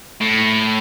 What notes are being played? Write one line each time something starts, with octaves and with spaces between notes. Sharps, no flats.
A2